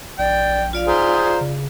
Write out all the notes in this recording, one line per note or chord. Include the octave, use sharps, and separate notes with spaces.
A#1 D5 G5
F4 D5 F5
G#4 C5 A#5
C#3